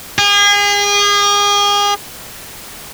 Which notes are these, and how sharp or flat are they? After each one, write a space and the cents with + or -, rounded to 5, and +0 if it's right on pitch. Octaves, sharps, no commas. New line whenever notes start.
G#4 -35